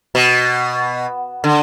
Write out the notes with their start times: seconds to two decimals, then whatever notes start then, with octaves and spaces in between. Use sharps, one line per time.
0.15 B2
1.44 D3